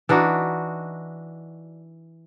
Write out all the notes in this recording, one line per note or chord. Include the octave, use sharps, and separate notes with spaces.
E3 D4 D#4 F#4